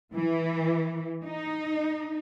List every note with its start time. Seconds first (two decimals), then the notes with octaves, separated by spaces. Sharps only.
0.15 E3
1.25 D#4